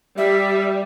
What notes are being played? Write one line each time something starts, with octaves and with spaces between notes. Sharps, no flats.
G3 E5